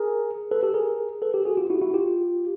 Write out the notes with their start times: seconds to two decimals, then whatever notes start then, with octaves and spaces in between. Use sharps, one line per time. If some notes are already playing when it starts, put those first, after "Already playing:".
Already playing: G#4 A#4
0.51 A4 B4
0.63 G4 A4
0.74 G#4 A#4
1.22 A4 B4
1.34 G4 A4
1.45 F#4 G#4
1.57 F4 G4
1.70 E4 F#4
1.82 E4 F#4
1.94 F4 G4